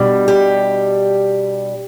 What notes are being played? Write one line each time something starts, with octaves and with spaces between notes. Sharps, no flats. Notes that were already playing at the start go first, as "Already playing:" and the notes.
Already playing: B2 G3 D4
G4